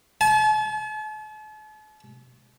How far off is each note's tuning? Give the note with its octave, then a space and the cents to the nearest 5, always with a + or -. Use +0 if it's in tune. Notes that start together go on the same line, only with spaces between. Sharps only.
A5 -45